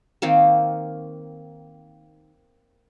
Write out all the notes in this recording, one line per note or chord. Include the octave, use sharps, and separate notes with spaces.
D#3 A#3 C4